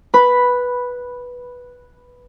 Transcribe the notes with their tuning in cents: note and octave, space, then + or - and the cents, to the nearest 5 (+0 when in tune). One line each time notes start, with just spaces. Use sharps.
B4 -5 B5 +0